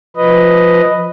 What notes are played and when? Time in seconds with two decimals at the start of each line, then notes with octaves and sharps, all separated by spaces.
0.17 F3 B4 D#5